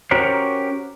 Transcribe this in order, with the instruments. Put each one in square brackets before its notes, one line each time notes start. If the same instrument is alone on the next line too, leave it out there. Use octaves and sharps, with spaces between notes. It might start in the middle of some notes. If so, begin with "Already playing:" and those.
[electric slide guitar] C#4 F#4 G4 A#4 C5 C#5